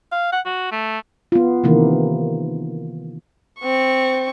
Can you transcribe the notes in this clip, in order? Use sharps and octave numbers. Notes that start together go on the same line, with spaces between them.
F5
F#5
F#4
A3
B3 F4
C3 D#3 E3 A#3
C4 C#6